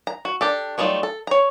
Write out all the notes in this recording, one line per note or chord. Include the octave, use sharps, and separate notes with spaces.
A#5
F#4
D4 G4 A4
F#3 G3 A3 D#4 F4
A4
C#5 A#5